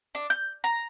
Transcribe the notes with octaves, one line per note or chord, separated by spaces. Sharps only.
D4
G6
A#5